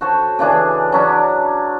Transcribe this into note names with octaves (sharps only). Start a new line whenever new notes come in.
F#4 A4 C5 C#5
C#3 E3 D4 G#4
F#3 C#4 D4